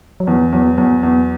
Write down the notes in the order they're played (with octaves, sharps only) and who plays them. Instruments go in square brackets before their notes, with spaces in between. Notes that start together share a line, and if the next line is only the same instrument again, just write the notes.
[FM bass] F#3
[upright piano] E2 [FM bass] E3
[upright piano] E2 [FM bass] F#3
[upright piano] E2 [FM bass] F#3
[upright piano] E2